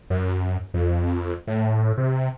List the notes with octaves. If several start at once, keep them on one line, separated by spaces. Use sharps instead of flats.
F#2
F2
A2
C3